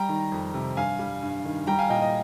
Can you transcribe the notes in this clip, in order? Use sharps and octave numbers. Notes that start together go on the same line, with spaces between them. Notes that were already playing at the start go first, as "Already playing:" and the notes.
Already playing: G3 G5 A#5
D#3
F2
C3
G2 F5 G#5
G3
G2
D#3
G3 G5 A#5
F5 G#5
A#2 D#5 G5
D#5